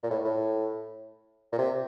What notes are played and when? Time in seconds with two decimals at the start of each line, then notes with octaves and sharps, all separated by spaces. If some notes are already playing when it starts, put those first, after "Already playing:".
0.03 A#2
0.10 A2
0.25 A2
1.52 A#2
1.58 C3